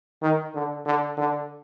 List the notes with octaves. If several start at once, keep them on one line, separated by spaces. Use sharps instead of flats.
D#3
D3
D3
D3